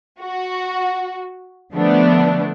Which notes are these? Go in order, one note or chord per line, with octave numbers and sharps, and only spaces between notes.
F#4
D3 F3 A3 B3 D4